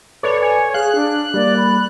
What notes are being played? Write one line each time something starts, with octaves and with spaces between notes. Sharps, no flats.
A4 B4 C#5 D5
C#5 G#5
G#4 F5 F#6
D4
G3 A#3 D5
B5